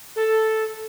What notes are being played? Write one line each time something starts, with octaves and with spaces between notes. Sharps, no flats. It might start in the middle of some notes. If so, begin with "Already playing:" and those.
A4